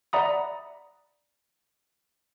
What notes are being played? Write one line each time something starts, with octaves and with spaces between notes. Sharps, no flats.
D5 E5 F#5 A#5 B5 D#6